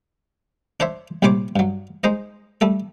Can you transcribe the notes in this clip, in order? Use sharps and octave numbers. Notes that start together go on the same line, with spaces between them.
D4 C5 C#5 E5
A#1 C3 G3 C5 C#5 D6
G2 F#3
G#3 D#4 C5 D#5
G3 A3 A4